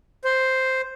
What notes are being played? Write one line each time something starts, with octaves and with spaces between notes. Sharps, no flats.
C5